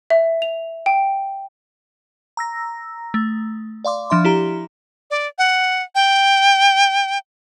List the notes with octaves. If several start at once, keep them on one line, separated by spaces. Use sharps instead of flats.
E5
F7
G5
A#5 E6 A#6
A3
D5 F5 C6 D6
F3 D4 E5 C6
E4 G4 A#5
D5
F#5
G5